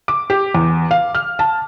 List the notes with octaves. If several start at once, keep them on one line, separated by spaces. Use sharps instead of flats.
D6
G4
E2
F5
F6
A5